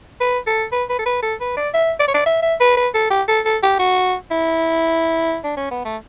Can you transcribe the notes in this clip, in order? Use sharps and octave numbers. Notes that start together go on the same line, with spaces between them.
B4
A4
B4
B4
A4
B4
A4
B4
D5
E5
D5
C#5
D5
E5
E5
B4
B4
A4
G4
A4
A4
G4
F#4
E4
D4
C#4
B3
A3